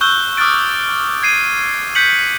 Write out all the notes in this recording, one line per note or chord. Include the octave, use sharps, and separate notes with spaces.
C#6 E6 F#6 G6 G7
D6 D#6 F6 F#6 A6 D7
G#6 C7 D#7
F#6 G6 B6 C#7 F#7